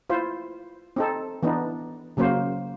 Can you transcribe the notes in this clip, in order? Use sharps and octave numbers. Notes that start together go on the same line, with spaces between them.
E4 F4 C5
C4 D#4 A4
E3 B3 D4 D#4
C#3 F#3 A#3 C5